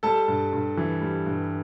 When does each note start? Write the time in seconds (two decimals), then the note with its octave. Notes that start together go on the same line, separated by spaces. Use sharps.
0.03 G3 A4 A5
0.28 G2
0.53 G2
0.77 E3
1.02 G3
1.26 G2